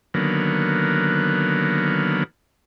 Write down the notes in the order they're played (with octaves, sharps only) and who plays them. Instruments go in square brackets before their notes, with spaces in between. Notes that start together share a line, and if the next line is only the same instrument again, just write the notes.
[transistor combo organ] D3 D#3 F#3 A#3 B3